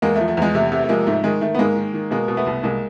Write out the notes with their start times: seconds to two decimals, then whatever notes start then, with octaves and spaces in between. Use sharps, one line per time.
0.02 E2 G#3 A#3
0.16 A3
0.20 F3
0.28 A3
0.37 E2 G#3
0.54 C3 A3
0.72 C3 A3
0.84 A3
0.89 F3 G#3 A#3
1.07 G#2 A3
1.24 D#3 G#3
1.41 D#3 A3
1.54 B3
1.59 G#2 G#3 A#3
1.76 D#3
1.94 D#3
2.11 B2 G#3 A#3
2.28 B2
2.37 A3 B3
2.46 C2
2.63 C2 G#3 A#3